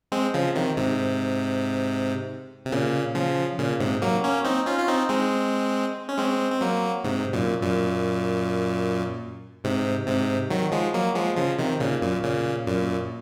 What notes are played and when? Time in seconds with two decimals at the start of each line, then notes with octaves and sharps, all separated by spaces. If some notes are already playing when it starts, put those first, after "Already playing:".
0.12 G#3 C4
0.34 C#3 F3
0.56 C3 D#3
0.77 G#2 C3
2.66 C3
2.72 A#2 C#3
3.15 C#3 F3
3.58 A#2 C#3
3.80 G#2 C3
4.02 F#3 A#3
4.24 A#3 C#4
4.44 C4 D#4
4.66 C#4 F4
4.79 F4
4.88 C4 D#4
5.09 G#3 C4
6.09 C#4
6.18 G#3 C4
6.52 C4
6.61 F#3 A#3
7.04 G#2 C3
7.33 F#2 A#2
7.62 F#2 A#2
9.64 G#2 C3
10.07 G#2 C3
10.50 D#3 F#3
10.72 F3 G#3
10.94 F#3 A#3
11.15 F3 G#3
11.37 C#3 F3
11.59 C3 D#3
11.80 A#2 C#3
12.02 F#2 A#2
12.23 A#2 C#3
12.67 F#2 A#2